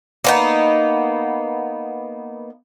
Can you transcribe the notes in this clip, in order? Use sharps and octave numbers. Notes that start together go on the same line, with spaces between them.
A#3 B3 D#4